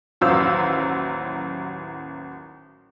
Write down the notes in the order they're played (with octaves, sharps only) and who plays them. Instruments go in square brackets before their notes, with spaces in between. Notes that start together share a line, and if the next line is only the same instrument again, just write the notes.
[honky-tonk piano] A1 D#2 F#3 C5 F5 E6